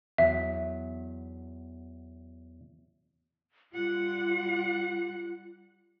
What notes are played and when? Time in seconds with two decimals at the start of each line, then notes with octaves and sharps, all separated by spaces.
0.18 E2 F#3 E5
3.73 G3 F4 F#5